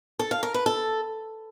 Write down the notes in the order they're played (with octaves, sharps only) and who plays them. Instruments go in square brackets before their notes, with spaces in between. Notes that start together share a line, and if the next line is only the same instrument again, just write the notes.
[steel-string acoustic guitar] A4
F5
A#4
B4
A4